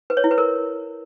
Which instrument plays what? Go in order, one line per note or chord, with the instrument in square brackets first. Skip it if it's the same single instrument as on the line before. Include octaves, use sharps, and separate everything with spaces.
[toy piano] B4
C#5
E4
B4
A#4